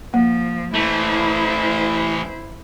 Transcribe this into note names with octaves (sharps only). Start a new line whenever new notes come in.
F3 A#3
E3 A3 E4 C5